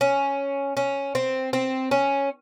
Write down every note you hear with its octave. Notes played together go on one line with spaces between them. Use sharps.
C#4
C#4
C4
C4
C#4